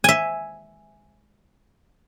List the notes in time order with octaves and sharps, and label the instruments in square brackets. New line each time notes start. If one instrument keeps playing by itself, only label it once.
[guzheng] E5 G#5